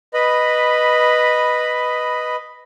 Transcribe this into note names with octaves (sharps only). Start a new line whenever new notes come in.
B4 D#5 B5